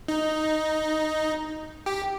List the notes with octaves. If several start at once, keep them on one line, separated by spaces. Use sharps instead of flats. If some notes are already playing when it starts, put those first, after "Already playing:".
D#4
G4